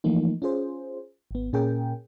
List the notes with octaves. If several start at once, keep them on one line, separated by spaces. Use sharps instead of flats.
E3 F3 A3 A#3 D#4
C#4 F4 G#4 C5
G#1 B3
A#2 C#4 G#4 A#4 G5